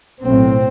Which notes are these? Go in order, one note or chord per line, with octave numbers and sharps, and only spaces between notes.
B1 A2 C4